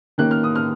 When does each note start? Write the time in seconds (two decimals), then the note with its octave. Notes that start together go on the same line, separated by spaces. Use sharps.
0.18 D#3 A#3 C#4 F#6
0.31 F6
0.44 D#6
0.55 F6